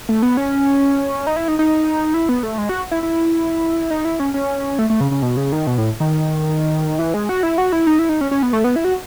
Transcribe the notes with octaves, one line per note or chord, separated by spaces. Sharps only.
A3
B3
C#4
D#4
E4
D#4
D#4
E4
B3
A3
G#3
F#4
E4
E4
D#4
E4
C#4
C#4
A3
A3
C#3
C#3
B2
C#3
D#3
B2
A2
D#3
E3
G#3
F#4
E4
F#4
E4
D#4
E4
D#4
C#4
C#4
B3
A3
B3
E4
F#4